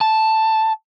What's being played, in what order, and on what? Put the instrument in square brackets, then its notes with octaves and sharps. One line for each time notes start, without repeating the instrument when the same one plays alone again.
[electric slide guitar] A5